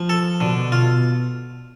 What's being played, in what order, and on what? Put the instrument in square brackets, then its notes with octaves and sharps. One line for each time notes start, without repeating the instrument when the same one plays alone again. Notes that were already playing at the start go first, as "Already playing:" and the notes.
Already playing: [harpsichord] F3
A4
[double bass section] B2 [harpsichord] D3
[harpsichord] F4